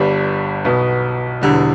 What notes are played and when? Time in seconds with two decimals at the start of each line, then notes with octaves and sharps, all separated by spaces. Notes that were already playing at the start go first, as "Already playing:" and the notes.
Already playing: G1 G2 G3 D4
0.65 B1 B2 B3
1.41 E1 E2 D3 G3